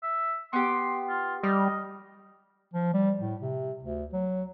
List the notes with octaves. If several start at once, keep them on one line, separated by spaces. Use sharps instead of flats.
E5
B3 G4 C6
F4
G3 D#5 F6
F3
G3
A2
C3
D2
F#3